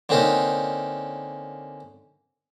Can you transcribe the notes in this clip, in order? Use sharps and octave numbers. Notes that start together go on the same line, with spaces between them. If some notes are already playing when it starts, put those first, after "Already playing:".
D3 A#3 C4 C#4 D#4